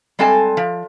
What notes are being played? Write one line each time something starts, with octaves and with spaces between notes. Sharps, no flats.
G3 G#3 C4 A4 G#5 A5
F3